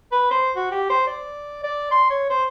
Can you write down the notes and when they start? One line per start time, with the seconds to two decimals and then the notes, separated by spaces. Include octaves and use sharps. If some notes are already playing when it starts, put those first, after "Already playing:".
0.12 B4
0.31 C5
0.56 F#4
0.72 G4
0.90 C5
1.07 D5
1.63 D5
1.91 C6
2.10 C#5
2.30 C5